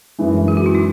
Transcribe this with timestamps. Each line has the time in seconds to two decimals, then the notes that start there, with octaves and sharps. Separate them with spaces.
0.18 F#2 E3 G#3
0.48 G#4
0.57 F#4
0.66 E4
0.75 D#4